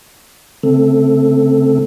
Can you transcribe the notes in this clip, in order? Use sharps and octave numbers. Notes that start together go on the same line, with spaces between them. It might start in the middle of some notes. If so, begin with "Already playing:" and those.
C#3 A3 C4 A4